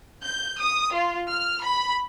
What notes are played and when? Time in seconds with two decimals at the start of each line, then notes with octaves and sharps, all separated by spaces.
0.24 G6
0.58 D#6
0.95 F4
1.31 F6
1.62 B5